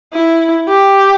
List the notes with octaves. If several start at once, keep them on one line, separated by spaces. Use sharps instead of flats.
E4
G4